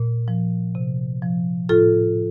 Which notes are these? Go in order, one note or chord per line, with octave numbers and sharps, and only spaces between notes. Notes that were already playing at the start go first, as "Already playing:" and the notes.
Already playing: A#2
F3
C3
F3
A2 F4 A4